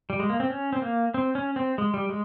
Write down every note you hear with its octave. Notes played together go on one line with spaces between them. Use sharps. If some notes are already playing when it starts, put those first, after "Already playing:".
G3
G#3
A#3
C4
C#4
C4
A#3
C4
C#4
C4
G#3
G3
G#3